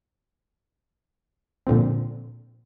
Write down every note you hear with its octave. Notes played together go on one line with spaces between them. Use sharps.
A#2 D3 F3 C4